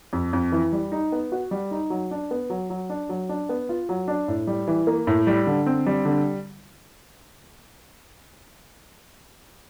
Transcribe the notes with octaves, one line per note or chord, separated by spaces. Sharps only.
F2
F2
E3
G3
D#4
B3
F#4
G3
D#4
F#3
D4
B3
F#3
F#3
D4
F#3
D4
B3
F4
F#3
D4
A2
G3
E3
A#3
A2
G3
D3
C4
G3
D3